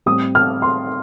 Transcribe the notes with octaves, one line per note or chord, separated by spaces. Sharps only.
A2 G3 C4 D#6
F6
C6